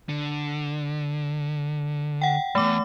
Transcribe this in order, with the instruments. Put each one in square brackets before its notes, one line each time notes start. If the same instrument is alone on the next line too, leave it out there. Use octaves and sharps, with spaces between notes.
[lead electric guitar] D3
[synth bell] F#5 G5
[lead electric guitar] E2 G2 [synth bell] A3 D6